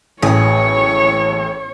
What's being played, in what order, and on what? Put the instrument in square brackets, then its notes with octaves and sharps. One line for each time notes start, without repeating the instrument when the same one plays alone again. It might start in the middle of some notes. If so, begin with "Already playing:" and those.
[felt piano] A1 A2 [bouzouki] G#4 [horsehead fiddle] C#5